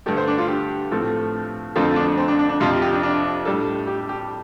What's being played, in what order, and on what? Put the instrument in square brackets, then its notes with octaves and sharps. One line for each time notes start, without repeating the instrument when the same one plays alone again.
[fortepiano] G2 D3 A3 [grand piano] G4
[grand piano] C5
D4
F4
G4
[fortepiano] A2 F3 A3 C4 A4
[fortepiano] F2 D3 A3 C4 A4 [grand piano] F4
[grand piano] F4
D4
C4
D4
D4
D4
[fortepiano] F2 C3 F3 [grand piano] F4
[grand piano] G4
G4
D4
D4
[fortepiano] A2 G3 D4 A4
[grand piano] G4
G4